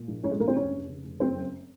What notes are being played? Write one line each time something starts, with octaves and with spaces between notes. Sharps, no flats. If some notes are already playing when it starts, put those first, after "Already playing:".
Already playing: A#2
A#1
A#1 C#4 C#5
G#3 G#4
A#1 A#3 A#4
C4 C5
F1 C#4 C#5
F1
C#3
F1
F#1 C4 C5
F#2